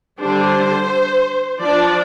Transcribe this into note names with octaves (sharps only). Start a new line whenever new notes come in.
D3 G3 D4 C5
F3 D4 D5